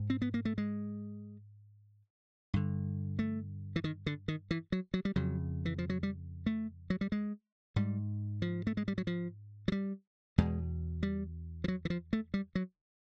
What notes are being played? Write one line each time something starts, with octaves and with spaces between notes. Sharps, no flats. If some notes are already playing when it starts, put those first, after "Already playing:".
Already playing: G#2
C4
B3
A#3
A3
G#3
G2 D3
A3
E3
D#3
D3
D#3
E3
F#3
F#3
G3
F2 C#3 F#3
E3
F3
F#3
G3
A3
F#3
G3
G#3
G#2 G3
F3
A3
G#3
G3
F#3
F3
F#3
G3
E2 B2 G#3
G3
F3
F#3
E3
F3
A3
G3
F#3